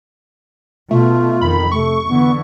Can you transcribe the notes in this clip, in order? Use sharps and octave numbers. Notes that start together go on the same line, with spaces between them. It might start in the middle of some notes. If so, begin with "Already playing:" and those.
B2 A3 F4
F2 D#3 B5
C3 A3 C#6
D3 E3 B3